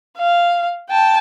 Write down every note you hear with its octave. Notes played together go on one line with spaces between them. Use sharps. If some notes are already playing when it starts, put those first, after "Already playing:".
F5
G5 A5